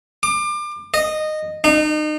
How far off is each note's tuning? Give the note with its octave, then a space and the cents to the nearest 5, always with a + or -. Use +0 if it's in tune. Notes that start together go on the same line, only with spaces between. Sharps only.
D6 +30
D#5 -15
D#4 -35